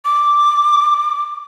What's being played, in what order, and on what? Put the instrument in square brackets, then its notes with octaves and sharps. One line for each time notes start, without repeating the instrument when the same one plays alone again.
[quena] D6